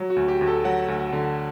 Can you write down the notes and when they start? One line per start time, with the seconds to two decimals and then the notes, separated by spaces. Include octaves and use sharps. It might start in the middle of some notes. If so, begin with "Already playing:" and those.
Already playing: F#3
0.10 F#4
0.16 D2
0.28 G4
0.41 D2
0.47 A4
0.64 F#3 F#5
0.88 D2
1.13 D3